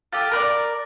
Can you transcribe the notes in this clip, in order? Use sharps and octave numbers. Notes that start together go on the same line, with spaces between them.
F4 G4 A4
A#4 B4 D5